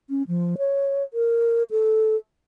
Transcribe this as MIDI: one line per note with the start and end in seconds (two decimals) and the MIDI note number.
0.10 0.23 61
0.28 0.55 53
0.58 1.03 73
1.14 1.63 70
1.71 2.16 69